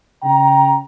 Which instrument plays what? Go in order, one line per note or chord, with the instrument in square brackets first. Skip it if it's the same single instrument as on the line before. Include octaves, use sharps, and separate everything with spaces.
[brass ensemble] C#3 G5 A#5